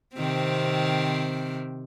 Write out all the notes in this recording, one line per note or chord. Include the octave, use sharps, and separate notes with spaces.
C3 D#3 C4